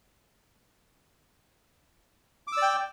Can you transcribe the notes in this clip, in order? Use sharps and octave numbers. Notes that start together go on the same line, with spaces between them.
D5 G5 D6 E6